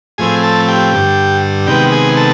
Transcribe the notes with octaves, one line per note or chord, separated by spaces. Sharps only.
A2 F3 A3 C4 G#4 G#5
A4 A5
G4 G5
G2 D3 G3
C3 D#3 G#3 B3 G4 G5
G#4 G#5
A4 A5